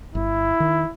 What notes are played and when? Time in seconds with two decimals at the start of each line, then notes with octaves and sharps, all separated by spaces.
0.15 G1 E4
0.60 D#3